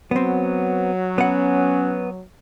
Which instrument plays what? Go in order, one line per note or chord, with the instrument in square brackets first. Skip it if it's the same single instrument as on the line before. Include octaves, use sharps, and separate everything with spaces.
[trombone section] F#3 [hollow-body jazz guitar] B3 C4
[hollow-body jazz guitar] B3 F#5 [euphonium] C#4